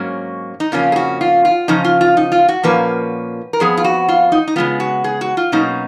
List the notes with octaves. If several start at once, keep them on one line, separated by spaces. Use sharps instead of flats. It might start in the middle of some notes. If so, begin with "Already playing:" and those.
Already playing: G#2 F#3 A#3 C#4
D#4
F2 C#3 F3 A#3 C#4 F4
G#4
F#4
F4
F4
C#3 F3 C#4 D#4
F4
F4
D#4
F4
F#4
A#2 F3 A#3 C#4 B4
A#4
F2 F3 B3 G#4
F4
F#4
F4
D#4
D#4
C#3 G#3 B3 F4
F#4
G#4
F#4
F4
B2 F#3 A#3 C#4 D#4